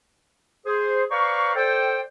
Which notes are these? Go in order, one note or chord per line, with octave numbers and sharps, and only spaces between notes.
G#4 C5
B4 C5 D5 F5 A#5 C#6
A4 C5 D5 G5